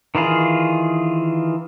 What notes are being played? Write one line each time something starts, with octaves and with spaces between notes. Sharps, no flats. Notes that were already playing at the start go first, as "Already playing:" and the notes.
D#3 E3 F4 G#4